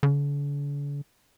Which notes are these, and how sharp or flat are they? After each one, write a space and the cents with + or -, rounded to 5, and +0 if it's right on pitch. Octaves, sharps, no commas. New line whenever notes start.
D3 -45